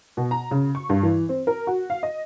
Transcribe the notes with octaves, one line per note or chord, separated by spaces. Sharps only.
B2
A#5
C#3
C#6
G2
E3
C4
A#4
F#4
F5
D#5